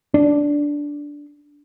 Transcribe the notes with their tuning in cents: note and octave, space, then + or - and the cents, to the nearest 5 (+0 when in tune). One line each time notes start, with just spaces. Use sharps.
D4 -10